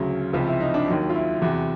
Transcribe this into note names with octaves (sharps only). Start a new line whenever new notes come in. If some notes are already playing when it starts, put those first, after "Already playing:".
Already playing: D2 C#3 F#3
C#2 C3 F3 F4
E4
D#4
D4
D#2 D#3 F#3
F4
E4
E2 C3 E3 F#4